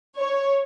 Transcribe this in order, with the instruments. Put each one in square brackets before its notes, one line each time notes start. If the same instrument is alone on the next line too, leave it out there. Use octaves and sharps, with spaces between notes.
[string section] C#5